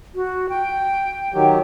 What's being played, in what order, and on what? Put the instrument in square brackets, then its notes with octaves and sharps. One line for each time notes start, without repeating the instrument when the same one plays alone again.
[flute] F#4
G5
[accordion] D#3 F#3 G4